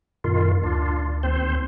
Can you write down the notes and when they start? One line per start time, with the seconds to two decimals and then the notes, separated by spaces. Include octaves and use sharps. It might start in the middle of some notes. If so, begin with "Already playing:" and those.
0.24 F#2 A#2 D#3 F4
0.63 D2 D4 F4
1.23 D#2 C4 C5